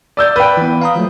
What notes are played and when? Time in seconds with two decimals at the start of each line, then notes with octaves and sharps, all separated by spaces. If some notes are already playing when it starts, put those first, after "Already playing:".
0.17 D5 E6 G6
0.36 B4 D5 G5
0.57 E3 B3
0.81 F5 A#5 D#6
0.96 F3 F#3 A3